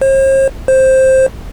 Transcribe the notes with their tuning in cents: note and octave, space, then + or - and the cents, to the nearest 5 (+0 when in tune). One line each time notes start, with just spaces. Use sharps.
C5 +45
C5 +10